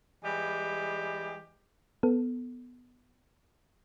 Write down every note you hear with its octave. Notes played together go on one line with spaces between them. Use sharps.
E3 G3 G#3 G4
B3 A4